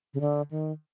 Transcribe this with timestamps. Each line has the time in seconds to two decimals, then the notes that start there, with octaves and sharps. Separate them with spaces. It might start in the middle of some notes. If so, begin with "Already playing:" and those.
0.14 C#3
0.21 D3
0.51 D#3